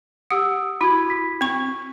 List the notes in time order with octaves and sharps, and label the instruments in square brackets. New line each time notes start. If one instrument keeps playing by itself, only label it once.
[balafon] G4 F#5 [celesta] D#6 E6
[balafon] E4 F#4 [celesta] B5 G#6
[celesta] B6
[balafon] C4 C#6